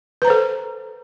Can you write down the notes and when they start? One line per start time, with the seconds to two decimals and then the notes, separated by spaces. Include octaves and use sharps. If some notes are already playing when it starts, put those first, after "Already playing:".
0.22 B4
0.25 A#5
0.27 C5
0.30 A4